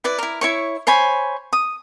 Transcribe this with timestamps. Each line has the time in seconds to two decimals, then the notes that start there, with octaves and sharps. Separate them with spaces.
0.04 E4 B4 D5
0.18 E4 A#4
0.41 E4 C#5 C#6
0.87 C5 C#5 G#5 B5
1.53 D#6